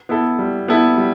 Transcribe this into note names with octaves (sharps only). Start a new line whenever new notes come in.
B3 E4 A4
G3
B3 E4 A4
G3